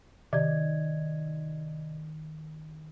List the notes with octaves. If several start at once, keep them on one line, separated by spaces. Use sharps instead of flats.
C3 D#3 D5 D#5 G#6